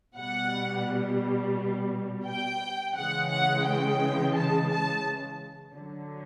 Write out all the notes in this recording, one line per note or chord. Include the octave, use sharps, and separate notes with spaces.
B2 G3 F#5
G5
C#3 E3 G#3 F#5
F#5
G5
A5
A5
D3 F#3